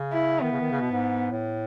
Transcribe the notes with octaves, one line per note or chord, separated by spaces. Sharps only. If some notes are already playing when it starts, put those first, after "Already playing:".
Already playing: C#3
E4
D#3 B3
C#3
D#3
C#3
B2
G#2
A2